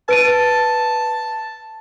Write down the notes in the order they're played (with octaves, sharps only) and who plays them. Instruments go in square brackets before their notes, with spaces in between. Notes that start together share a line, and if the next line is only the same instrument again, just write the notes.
[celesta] B4 D7 D#7 [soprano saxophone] A5